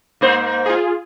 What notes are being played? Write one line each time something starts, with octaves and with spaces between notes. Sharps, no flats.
G#2 A#3 C5
F4 G#4